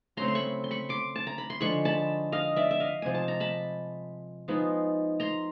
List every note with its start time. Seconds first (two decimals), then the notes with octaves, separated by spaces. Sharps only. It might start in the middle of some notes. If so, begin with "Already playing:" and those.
0.17 C#3 F#3 A3 C4 A#5 C6
0.28 C6
0.35 B5 C#6
0.64 C6
0.71 B5 C#6
0.89 C6 D6
1.16 A5
1.27 A#5
1.38 B5
1.50 C6
1.60 D3 F3 G#3 B5 C#6
1.85 A5 B5
2.32 D#5 F5
2.56 D5 E5
2.71 E5
2.80 D#5 F5
3.02 C3 F3 G#3 G#5
3.14 A5
3.28 A#5
3.40 A5 B5
4.48 F3 G#3 B3 D#4
5.20 A#5 C6